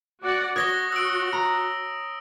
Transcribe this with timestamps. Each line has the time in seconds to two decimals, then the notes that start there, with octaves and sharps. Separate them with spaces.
0.21 F#4 D5 F#5
0.56 F#4 C#5 D#6 A#6 G7
0.92 E6 D7
1.33 A#5